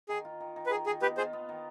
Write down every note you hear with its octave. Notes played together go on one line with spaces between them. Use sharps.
D#3 G#4
F4
D#3
D#3
B4
D#3 G#4
D#3 G#4
B3 G4 B4
F4 G#4 C5
B3
D#3